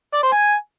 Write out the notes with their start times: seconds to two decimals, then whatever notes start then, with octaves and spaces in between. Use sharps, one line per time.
0.14 D5
0.23 C5
0.32 G#5